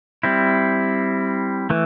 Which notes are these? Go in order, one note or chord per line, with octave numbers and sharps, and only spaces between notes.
G3 C4 E4
E3 A3